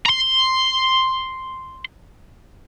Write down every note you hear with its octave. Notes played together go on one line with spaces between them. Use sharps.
A#5 C6